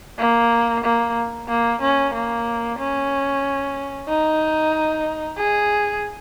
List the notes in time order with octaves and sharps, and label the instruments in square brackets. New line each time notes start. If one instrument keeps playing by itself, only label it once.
[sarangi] A#3
A#3
A#3
C#4
A#3
C#4
D#4
G#4